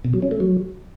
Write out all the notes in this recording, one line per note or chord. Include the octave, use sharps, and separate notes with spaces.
B2
F#3
C#4
A3
F#3